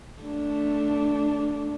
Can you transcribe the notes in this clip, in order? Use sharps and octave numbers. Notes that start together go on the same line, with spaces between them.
A3 D4